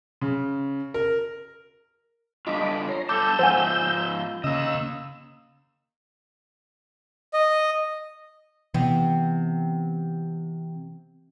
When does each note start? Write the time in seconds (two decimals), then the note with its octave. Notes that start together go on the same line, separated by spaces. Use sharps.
0.21 C#3
0.94 A#4
2.47 G3 D4 F4 D#5 B5 D6
2.89 C#5 A#5 C6
3.09 G2 A4 A5 D6 E6 G6
3.39 G#2 F3 C5 F#5 G#5
4.44 C#3 A#3 D#5 E6
7.33 D#5
8.74 C3 E3 B3